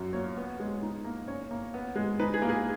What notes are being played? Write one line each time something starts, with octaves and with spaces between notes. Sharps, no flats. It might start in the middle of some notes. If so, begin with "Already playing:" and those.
Already playing: F#2
A#3 C#5
B3
G#3
D#4
A#3
C#4 C#5
A#3
B3
G#3
D#4 B4
G#4
A#3
G#4